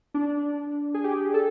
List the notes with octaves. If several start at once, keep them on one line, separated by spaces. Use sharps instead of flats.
D4
G#4
G4
A4